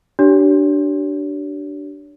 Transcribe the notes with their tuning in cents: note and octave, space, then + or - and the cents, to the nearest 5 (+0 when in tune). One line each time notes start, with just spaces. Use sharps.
D4 +0 G4 -35 C#5 +30